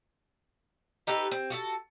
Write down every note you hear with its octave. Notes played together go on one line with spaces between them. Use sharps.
D#4 G4 A4 B4
C4
F#4 G4 A4